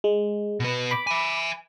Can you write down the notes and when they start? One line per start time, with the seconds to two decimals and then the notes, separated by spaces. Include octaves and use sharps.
0.04 G#3
0.60 B2 B3
0.91 B5 D6
1.07 E5 G#5